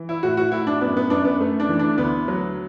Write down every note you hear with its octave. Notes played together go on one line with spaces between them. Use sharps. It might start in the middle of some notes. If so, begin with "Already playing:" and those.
Already playing: E3
E4
A2 F#4
F#4
A2 E4
D4
F#2 B3
B3
F#2 D4
B3
A3
D4
E3
D4
D2 B3
F#3